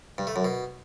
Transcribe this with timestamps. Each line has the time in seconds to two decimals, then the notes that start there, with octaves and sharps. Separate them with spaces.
0.18 G2
0.27 A3
0.36 F#2
0.45 B2